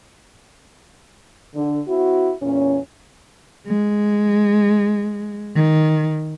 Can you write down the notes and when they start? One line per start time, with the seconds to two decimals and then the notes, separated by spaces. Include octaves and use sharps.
1.54 D3
1.87 C4 E4 F#4
2.42 E2 A#2 C#4
3.66 G#3
5.55 D#3